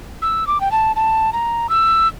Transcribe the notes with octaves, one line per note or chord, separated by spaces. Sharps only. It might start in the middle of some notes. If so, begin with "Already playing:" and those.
E6
D6
G5
A5
A5
A#5
E6